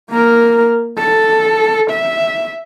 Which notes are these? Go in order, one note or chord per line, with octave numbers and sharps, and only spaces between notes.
A#3 A#4
A4
E5